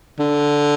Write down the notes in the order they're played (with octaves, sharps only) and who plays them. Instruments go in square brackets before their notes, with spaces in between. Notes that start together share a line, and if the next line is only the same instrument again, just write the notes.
[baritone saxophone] D3